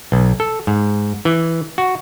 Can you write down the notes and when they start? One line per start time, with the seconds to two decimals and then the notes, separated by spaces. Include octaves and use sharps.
0.12 B1
0.40 A4
0.67 G#2
1.25 E3
1.78 F#4